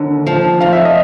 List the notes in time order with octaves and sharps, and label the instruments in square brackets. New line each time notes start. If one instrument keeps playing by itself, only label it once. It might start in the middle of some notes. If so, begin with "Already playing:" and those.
Already playing: [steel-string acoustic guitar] D#2 D3
F3
[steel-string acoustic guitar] F2 [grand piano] F5
[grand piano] E5
D#5